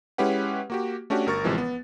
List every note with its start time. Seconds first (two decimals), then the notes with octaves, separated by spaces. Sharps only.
0.18 G#3 C#4 E4 G4 B4 F#5
0.70 A#3 F#4 G4
1.10 A3 C#4 D4 F#4 G4
1.26 G1 A#4 C#6 A6
1.44 A1 C3 E3 F3 G#3
1.58 B3